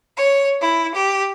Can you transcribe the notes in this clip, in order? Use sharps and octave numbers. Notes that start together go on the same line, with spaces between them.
C#5
E4
G4